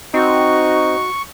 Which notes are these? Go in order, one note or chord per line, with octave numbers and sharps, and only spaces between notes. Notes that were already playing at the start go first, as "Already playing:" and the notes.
C4 D#4 F#4 C#6